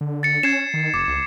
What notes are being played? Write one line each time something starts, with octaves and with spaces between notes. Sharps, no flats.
D3
A6 C#7
C#4 G#6 C7 E7
D#3
F1 D6
C#2